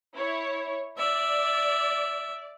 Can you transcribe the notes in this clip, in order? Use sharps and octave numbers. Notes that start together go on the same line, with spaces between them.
E4 C#5
D5 E5